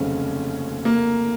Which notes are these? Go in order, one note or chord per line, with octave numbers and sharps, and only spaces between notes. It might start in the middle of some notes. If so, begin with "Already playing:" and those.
Already playing: F1 D#2 C#3 F#3 C4 C#4
A#3